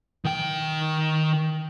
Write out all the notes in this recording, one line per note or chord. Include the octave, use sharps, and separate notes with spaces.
D#3 G5